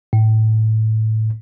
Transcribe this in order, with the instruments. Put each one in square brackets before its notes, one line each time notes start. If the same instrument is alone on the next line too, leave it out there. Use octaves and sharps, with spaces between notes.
[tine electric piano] A2